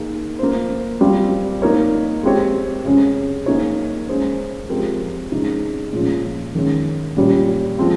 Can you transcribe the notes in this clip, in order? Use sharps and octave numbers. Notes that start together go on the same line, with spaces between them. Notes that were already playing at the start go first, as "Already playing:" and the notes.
Already playing: A#3 D#4 G#4
A#3 F4 C5
G3 C4 F4
A#3 D#4 A#4 C#5
G#3 C4 G4 C#5
C#3 G#3 C#4 G#4
A#3 D#4 G#4 C#5
G#3 C#4 G#4 C5
F3 G#3 C4 G4 A#4
C#3 G#3 D#4
A#2 F3 G#3 C#4 F4
D#3 G#3 C#4
A#2 G3 C#4 G4
F3 G#3 C4 F4